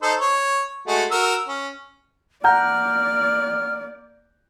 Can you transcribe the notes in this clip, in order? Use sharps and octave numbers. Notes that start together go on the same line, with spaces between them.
D#4 A4 C5
C#5
G#3 A3 F#4
F#4 A#4 E6
C#4
A#3 D5 F#5 A#5 F6 G6